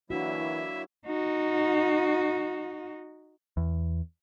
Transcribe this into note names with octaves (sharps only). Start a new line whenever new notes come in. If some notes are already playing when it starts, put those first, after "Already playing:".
E3 F#3 A#3 D4 E4 F#4 E5
D#4 F#4
E2